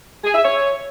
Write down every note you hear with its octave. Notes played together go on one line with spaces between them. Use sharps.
G#4
E5
C#5